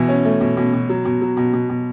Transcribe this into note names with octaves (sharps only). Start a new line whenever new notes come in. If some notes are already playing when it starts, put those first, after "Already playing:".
Already playing: B2 E3
C#4
A3
B2
B2
B2
F#3
B2
F#3
B2
B2
B2